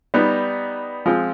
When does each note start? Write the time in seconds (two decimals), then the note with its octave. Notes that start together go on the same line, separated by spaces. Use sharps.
0.14 G3 B3 D#4
1.06 F3 G#3 C4